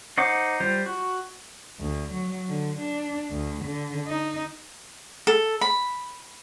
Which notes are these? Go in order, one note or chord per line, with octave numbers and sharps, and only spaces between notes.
D#4 C5 F#5 D6
G3 F4 C5
F#4
D2
F#3
D3
D4
D2
D3
D#4
A4
B5